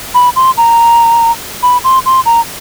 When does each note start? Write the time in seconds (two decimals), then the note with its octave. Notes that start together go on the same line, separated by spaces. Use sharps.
0.15 B5
0.36 C6
0.58 A#5
1.63 B5
1.84 C6
2.06 C6
2.26 A#5